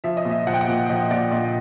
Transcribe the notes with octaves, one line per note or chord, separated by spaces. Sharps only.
F3 E5
D#5
A#2
E5
F3 F#5
G5
F#5
A#2
F3 D#5
A#2 D5
A#2 D#5